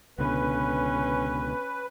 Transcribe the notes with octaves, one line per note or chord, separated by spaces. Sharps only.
C#2 B2 D3 C#4 B4